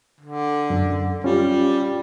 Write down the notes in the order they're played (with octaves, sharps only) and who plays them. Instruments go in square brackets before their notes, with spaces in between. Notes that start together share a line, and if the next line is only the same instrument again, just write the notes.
[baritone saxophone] D3
[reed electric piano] F#2
[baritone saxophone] G3 [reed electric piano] C#4 F4